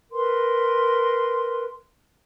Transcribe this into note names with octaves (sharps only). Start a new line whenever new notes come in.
A#4 B4 C6